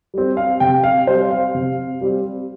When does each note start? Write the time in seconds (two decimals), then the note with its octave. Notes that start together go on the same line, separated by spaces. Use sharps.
0.14 G3 C4
0.37 F5
0.60 C3 G5
0.84 F5
1.07 G3 C4 C5
1.31 F5
1.55 C3
2.01 G3 C4